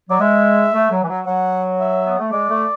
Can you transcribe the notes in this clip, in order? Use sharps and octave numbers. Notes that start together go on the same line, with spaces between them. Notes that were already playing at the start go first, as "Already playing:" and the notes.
F#3 D5
G#3 E5
A3
F#3
E3
F#3
F#3 F#5
E5
B3
A3
G#3 D5
A3